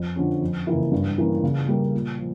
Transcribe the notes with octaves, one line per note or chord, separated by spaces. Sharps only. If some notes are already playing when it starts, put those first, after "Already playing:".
Already playing: F2
D3 F3 C#4
F2
C#3 E3 A#3 E4
G2
E3 A#3 C#4
C#3
G3 A#3
A#2
F3